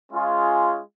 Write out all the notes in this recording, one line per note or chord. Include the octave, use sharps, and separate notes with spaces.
G#3 C#4 F4 G#4